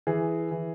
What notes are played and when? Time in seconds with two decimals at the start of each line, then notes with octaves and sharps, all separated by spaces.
0.07 E3 G#4
0.51 E3